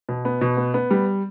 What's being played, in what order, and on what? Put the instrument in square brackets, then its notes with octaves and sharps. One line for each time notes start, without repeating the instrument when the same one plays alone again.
[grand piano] B2
B3
B2
B3
B3
G3